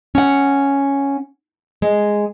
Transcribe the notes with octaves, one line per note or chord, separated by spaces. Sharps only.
C#4 F#5
G#3